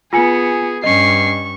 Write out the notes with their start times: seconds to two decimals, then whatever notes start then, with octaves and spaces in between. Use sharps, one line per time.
0.13 B3 F4 G#4 G#5 C#7
0.84 G2 C#4 D#5 C#6 C7